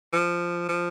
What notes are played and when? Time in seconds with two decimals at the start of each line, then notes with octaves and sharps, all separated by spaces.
0.13 F3
0.69 F3